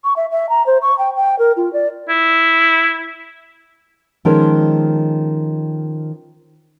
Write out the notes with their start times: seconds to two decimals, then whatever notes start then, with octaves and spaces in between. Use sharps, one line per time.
0.04 C#6
0.16 E5
0.31 E5
0.49 A#5
0.66 C5
0.82 C#6
0.98 G5
1.16 G5
1.39 A#4
1.57 F4
1.73 D5
2.09 E4
4.25 D#3 F3 G#3 C#4 A4 A#4